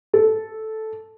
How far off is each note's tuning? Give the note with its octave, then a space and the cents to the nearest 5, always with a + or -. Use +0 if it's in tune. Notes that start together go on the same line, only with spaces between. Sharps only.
A4 -5